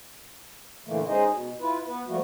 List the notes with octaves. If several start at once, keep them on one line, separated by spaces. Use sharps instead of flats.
A#2 D3 E3 A3 A#3
G#3 C#4 D#4 G#4 C5 D#5
B2
E4 F4 B4
B3 B4
F3 G3 A3 A#3 F#4